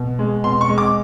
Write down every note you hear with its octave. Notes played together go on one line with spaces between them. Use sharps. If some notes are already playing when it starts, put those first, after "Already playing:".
Already playing: B2
G#3
B2 C6
C#6
G#3
D6